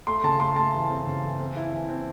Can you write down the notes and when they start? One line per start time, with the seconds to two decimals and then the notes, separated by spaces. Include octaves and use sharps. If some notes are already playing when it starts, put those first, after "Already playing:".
0.07 A3 C6
0.24 C#3 A5
0.40 A3 C6
0.56 A3 A5
0.74 E3
0.89 C4
1.07 C#3
1.23 E3
1.39 C4
1.57 E4
1.73 E3
1.89 C4